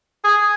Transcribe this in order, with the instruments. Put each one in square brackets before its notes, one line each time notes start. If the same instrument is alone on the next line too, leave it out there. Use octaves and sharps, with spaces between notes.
[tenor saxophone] G#4